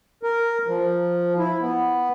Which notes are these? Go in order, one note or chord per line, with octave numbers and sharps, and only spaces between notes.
A#4
F3
E4
B3